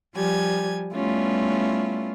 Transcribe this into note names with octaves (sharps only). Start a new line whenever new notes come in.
F3 G3 G#5 G#6
G3 A3 B3 C#4 E4 F4